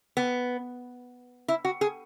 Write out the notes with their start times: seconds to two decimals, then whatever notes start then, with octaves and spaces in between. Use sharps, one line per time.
0.17 B3
1.48 E4
1.65 F#4
1.81 G#4